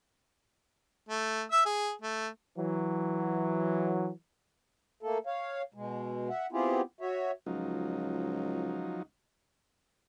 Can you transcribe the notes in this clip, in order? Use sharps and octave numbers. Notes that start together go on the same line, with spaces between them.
A3
E5 E6
G#4
A3
E3 F#3
A3 A#3 A4
C#5 F5
B2 G#3
E5 F#5
B3 C4 E4 F4 G4 G#4
F#4 C#5 E5
C#2 F3 F#3 D#4